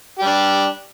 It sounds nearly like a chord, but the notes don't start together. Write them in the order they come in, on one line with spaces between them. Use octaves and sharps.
G4 G3 D4